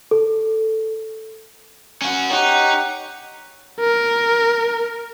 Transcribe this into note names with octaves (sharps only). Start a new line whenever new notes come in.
A4
C#4 F#4
D#4 G4 C#5 F#5
A#4